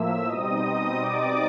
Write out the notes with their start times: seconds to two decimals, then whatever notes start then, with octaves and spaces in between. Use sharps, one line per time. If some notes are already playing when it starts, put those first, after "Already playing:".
Already playing: A2 F3 A#3 E5 E6
0.26 B2 G3 C4 D#4 D#5 D#6
1.00 D5 D6